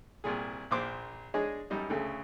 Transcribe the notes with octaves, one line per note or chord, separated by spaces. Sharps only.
C2 A#2 G#4
A#1 A#2 C5 C6 D6
G#3 D4 G#4 C#5 D#5
F#2 G3 D#4
D2 C#3 A4